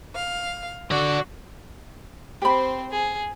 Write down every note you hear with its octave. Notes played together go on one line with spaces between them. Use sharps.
F5
D3 F#4 D5
C4 G4 C5 B5
G#4